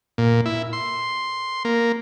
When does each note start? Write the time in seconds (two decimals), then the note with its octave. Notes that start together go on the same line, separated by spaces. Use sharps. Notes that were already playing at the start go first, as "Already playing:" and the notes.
0.18 A#2
0.46 E4
0.73 C6
1.65 A#3